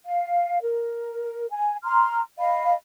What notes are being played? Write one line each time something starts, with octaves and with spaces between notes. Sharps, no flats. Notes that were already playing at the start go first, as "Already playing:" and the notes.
F5
A#4
G#5
A#5 C6 F6
D#5 F5 B5